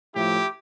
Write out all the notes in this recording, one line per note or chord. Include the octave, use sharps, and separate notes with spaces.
A2 F3 A3 E4 G4